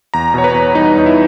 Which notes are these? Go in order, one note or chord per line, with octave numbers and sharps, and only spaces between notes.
E2 A#5
B2 C#5
B4
E2
G3 D#4
E2 D#4
E4